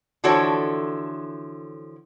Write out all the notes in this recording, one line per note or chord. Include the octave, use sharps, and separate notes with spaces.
D3 E3 F3 F#4 A4 C#5